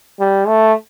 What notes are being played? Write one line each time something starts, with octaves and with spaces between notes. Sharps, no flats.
G3
A3